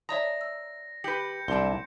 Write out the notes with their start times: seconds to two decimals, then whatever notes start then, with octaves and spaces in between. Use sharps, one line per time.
0.09 C#5 D5 E5 A#5 D#6 A#6
0.41 E6
1.04 G4 B4 G6 C#7 F#7
1.48 C2 F#2 D4 E4 C6